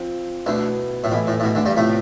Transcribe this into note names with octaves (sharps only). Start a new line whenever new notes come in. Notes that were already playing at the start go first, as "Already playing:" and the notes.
Already playing: F3 C4 F4
D2 B2 D3 B3 E4
A2
B2 E3 A3 E4
A2
A2
B2
D2 D3
G2 G3
A2 C3 F3 A3 B3 E4